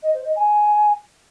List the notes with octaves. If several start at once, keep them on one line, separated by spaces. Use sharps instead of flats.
D#5
C5
D#5
G#5